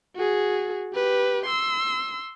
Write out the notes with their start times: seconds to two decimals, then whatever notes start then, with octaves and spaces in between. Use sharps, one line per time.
0.16 F#4 G#4
0.94 G4 B4
1.46 C6 E6